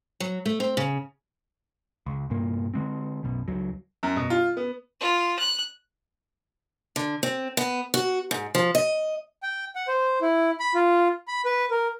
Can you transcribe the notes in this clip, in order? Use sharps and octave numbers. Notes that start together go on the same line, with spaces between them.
F#3
A3
C4
C#3
C#2
C2 G2 A#2 A#3
D3 G#3 C4
B1 F#2 B2
C#2 F#3
F#2
B2
F4
B3
F4
F#6
D3
C4
B3
F#4
G#2
F3
D#5
G5
F#5
C5
E4
B5
F4
B5
B4
A#4